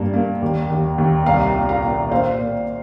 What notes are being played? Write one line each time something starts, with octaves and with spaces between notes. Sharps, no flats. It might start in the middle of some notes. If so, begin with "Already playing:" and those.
Already playing: G2 A#3
A#3
D#2
D#2
D#2
C2 F5 A#5
A#2
F5 A#5
A#2
A#3 C5 F5
A#2